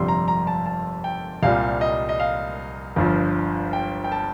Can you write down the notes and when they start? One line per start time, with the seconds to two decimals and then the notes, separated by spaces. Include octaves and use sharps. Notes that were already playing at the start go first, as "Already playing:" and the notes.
Already playing: G1 F2 C3 G3 C6
0.08 A#5
0.28 A#5
0.47 A5
0.66 A5
1.04 G5
1.43 C2 A#2 G3 F5
1.81 D#5
2.09 D#5
2.20 F5
2.96 G1 G2 F3
3.73 G5
4.04 G5
4.12 A5